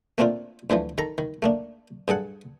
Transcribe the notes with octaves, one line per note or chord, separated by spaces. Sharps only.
A3 A#3 C4 D4 F4
D2 D3 E3 F3
D#3 A4 A#5
D#3
A3 A#3 D4
G2 G#4 A4 F#5